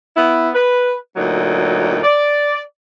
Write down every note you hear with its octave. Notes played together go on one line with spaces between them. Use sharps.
B3 E4
B4
D2 A#2 F#3 D#4
D5